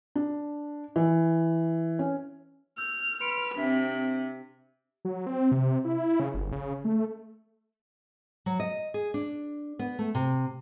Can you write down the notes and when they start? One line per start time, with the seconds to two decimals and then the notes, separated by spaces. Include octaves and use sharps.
0.15 D4
0.96 E3
1.99 C#4
2.78 E6 F6 G6
3.21 B4 C6 C#7 D7
3.56 C3 C4 D4 E5 B6
5.05 F#3
5.26 C4
5.52 C3
5.85 E4
6.20 C#3
6.34 G1
6.52 C#3
6.85 A3
8.46 F#3
8.60 D#5
8.94 G#4
9.14 D4
9.79 B3
9.99 A3
10.15 C3